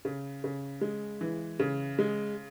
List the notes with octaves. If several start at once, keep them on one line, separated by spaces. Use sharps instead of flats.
C#3
C#3
G#3
E3
C#3
G#3